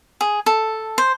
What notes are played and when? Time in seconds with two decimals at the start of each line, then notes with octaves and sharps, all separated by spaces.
0.21 G#4
0.46 A4
0.98 C5